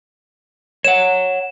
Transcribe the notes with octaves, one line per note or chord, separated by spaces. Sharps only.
C#5 F#5 E7